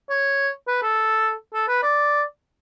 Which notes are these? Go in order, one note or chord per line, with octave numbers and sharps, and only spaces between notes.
C#5
B4
A4
A4
B4
D5